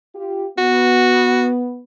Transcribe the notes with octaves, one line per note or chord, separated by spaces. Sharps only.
F4 G4
B3 F#4